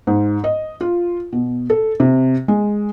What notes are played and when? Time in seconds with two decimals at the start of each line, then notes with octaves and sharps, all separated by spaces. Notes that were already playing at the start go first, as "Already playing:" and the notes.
0.07 G#2
0.44 D#5
0.81 F4
1.33 B2
1.70 A4
2.00 C3
2.48 G#3